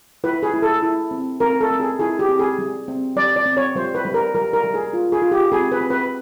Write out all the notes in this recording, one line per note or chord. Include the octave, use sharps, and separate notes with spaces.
E4 B4
G#4
E4
A4
E4
C4
C4 A#4
A4
C4
G#4
E4 G#4
G4
C4
G#4
G3
C4
G3 D5
D5
C4
C#5
G3 C5
B4
G3
A#4
G3 A#4
A#4
G3
G#4
F4
G#4
F4
G4
C4 G#4
B4
C4
B4